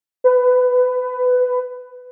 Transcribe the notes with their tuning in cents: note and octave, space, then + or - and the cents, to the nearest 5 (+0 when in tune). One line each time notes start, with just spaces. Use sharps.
B4 +20